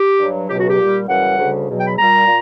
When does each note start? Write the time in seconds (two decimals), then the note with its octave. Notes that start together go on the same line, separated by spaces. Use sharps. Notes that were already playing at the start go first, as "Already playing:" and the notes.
Already playing: G4
0.20 G2 F#3
0.48 C#2 B2 F#3 G4
0.59 F#4
0.69 G4
0.79 A#2 G3
1.08 F#2 C#3 E3 G3 F#5
1.38 D2 C#3 G3
1.67 E2 B2 F#3
1.78 G5
1.87 B5
1.97 A#2 G3 A#5
2.26 A#2